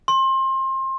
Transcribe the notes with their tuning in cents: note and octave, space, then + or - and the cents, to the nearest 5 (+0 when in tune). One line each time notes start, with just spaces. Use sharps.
C6 +25